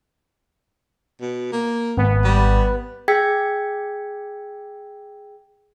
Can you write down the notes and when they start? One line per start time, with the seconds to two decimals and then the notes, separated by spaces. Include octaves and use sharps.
1.21 B2
1.52 A#3
1.97 G#1 B3
2.24 G3
3.08 G#4 G5 E6 G#6 B6 C#7